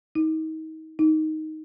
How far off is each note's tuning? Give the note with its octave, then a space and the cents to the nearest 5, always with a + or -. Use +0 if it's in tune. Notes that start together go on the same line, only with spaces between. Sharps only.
D#4 +30
D#4 +5